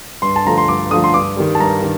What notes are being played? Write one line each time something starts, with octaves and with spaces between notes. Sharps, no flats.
G2 C6
A5
D3 F3 A3 A#5
C6
G2 D6
D3 F3 A3 D#6
C6
G2 D6
D#3 G3
A5
G2 A#5
D#3